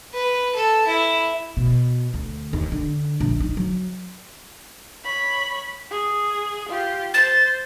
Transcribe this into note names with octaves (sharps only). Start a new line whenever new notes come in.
B4
A4
E4
B2
D2
D#2
D3
A#1
D#4
F#3
C#5 B5
G#4
F4 G4
C5 A6